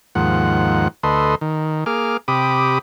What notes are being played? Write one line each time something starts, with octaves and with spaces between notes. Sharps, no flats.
D#2 G#2 F3 F#5
D2 A4 B4 D#5 C6
D#3
A#3 G#4 D6 F6
C3 G4 B5 D6 D#6